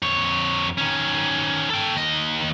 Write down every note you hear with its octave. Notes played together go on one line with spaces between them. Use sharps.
F2 C#5
D#3 C#4
A4 G5
D#2 D#5